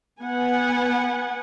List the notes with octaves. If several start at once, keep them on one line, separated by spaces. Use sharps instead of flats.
B3 F#5 G#5